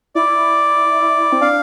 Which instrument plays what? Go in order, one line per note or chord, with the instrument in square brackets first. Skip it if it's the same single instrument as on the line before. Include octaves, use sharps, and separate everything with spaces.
[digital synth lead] E4 [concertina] D5
[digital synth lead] C4
[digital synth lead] D4 [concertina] F5